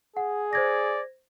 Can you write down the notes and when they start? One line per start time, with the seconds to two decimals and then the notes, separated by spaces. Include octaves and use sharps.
0.17 G#4 F#5
0.53 C5 D5 G#6 A#6